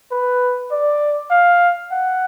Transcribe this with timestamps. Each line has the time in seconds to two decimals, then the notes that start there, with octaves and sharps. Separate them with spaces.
0.11 B4
0.71 D5
1.31 F5
1.91 F#5